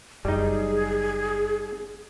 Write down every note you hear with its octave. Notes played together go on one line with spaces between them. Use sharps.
F#1 F#2 G3 D#4 G#4